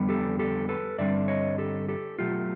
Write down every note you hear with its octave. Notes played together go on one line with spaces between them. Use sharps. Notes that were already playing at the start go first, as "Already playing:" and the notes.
Already playing: F2 D3 G3 B3
G4 A4
G4 A4
A4 B4
G2 D3 G3 C4 D5 E5
C#5 D#5
G4 A4
G4 A4
B2 F#3 A3 F4 G4